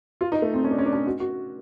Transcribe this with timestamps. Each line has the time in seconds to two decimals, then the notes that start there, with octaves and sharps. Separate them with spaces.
0.21 F4
0.32 D#4
0.42 A3
0.54 C4
0.64 C#4
0.71 D4
0.78 C#4
0.85 D4
0.93 C#4
1.07 F#4
1.20 F#4